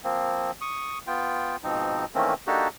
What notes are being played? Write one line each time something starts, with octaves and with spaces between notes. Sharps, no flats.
F3 A#3 C4
C#6 D#6
B3 F4 G5
G#2 B2 F3 C4 D#4
D#3 E3 A3 A#3 C4 C#4
A#3 D4 D#4 F#4 G4 A4